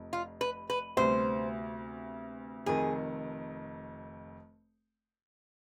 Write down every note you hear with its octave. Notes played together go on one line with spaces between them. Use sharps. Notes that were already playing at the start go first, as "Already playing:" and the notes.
Already playing: F1 F2
F4
B4
B4
D2 C3 G3 B3 C5
F1 F2 D#3 G#4